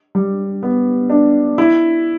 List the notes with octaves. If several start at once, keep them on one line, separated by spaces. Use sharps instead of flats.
G3
B3
D4
E4